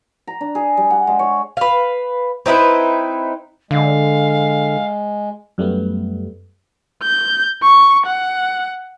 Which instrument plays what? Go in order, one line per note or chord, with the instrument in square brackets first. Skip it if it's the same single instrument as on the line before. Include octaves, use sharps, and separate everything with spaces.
[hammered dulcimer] A#5
D4
G#4
G3
F#5
G#3
C#5
[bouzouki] B4 F5
C4 D#4 E4 B4
[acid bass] D3 [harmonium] G#3 [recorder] F5
[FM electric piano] F#2 G3 A3 B3
[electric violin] G6
C#6
F#5